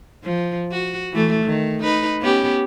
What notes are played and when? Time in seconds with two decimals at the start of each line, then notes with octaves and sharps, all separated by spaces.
0.23 F3
0.72 F#4
1.12 E3 A3
1.45 D#3
1.83 D#4 B4
2.22 B3 C#4 G4